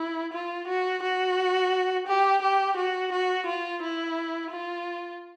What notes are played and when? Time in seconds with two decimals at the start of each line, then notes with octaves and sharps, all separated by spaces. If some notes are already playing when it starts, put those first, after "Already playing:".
Already playing: E4
0.33 F4
0.67 F#4
1.03 F#4
2.07 G4
2.42 G4
2.77 F#4
3.12 F#4
3.46 F4
3.82 E4
4.51 F4